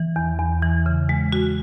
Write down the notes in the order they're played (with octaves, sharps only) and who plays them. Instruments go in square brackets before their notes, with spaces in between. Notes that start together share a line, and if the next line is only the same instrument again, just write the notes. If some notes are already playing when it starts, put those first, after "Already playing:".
Already playing: [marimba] E3
E2
E2
E3
C#3
G#3
F#4